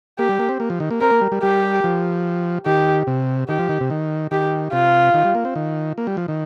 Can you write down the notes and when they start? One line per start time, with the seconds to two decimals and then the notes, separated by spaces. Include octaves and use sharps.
0.19 A#3 G4
0.29 G3
0.39 A#3
0.49 C4
0.60 A#3
0.70 F3
0.80 D#3
0.91 A#3
1.01 C4 A#4
1.11 A#3
1.21 G3
1.32 G3
1.43 G3 G4
1.84 F3
2.66 D#3 G4
3.07 C3
3.49 D#3 G4
3.59 F3
3.69 D#3
3.81 C3
3.90 D#3
4.31 D#3 G4
4.72 C3 F4
5.14 D#3
5.25 G3
5.35 A#3
5.45 C4
5.55 D#3
5.98 A#3
6.07 G3
6.17 F3
6.28 D#3